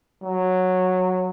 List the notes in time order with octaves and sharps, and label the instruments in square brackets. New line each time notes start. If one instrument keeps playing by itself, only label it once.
[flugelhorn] F#3